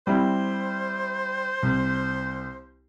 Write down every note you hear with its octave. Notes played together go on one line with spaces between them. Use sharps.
G3 C4 E4 C5
C2